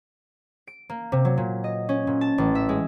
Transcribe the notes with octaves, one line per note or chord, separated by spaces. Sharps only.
D7
A#3
C3
F#3
A#2
D#5
C#4
A#2
A5
A1
E5
G#3